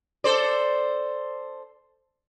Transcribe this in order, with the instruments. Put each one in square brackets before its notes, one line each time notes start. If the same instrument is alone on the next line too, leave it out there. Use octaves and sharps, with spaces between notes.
[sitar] A4 C5 D5